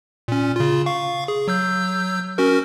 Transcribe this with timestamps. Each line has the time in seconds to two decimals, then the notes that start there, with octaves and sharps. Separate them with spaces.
0.28 A#2 C#4
0.56 C#3 F4
0.86 F5 C#6
1.28 G#4
1.48 F#3 E6 G6
2.38 C#4 F#4 A#4